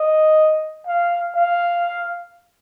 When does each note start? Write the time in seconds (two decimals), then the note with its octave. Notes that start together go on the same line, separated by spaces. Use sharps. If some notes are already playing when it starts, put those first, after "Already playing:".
Already playing: D#5
0.87 F5
1.35 F5